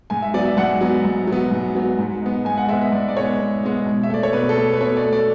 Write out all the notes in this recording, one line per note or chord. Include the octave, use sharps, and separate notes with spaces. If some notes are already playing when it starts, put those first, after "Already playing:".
G#2 G#5
E5
F#3 B3 D5
E5
G#2 F#5
F#3 B3
G#2
F#3
B3
G#2
F#3 B3
G#2
G#3 B3
G#2 G#5
F#5
G#3 B3 E5
E5
G#2 D5
D5
G#3 B3 C#5
G#2
G#3 B3
B2
E5
A3 D5
C#5
B2 B4
A4
A3
B4
B2 C#5
D5
A3
D5